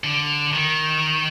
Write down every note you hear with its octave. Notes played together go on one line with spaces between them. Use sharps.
D3
D#3